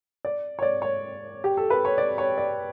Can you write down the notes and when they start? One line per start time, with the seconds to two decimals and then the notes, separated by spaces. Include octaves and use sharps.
0.25 D5
0.59 C#5
0.62 D5
0.82 C#5
1.44 G4
1.57 A4
1.70 B4
1.85 C#5
1.98 D5
2.18 C#5
2.38 D5